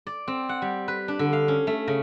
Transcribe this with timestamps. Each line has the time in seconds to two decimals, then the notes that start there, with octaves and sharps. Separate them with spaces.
0.07 D5
0.28 C4
0.49 F#5
0.62 G3
0.88 B4
1.08 D4
1.19 D3
1.33 F5
1.48 C#4
1.67 A3
1.88 C#3